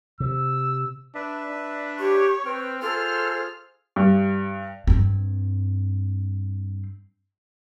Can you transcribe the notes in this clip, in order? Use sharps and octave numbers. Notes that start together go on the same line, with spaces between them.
C3 E6
D4 B4 E5
D4
G4 C#5
C4 B4 G5 F6
F4 G#4 A4 C5 F6
G2
G2 C4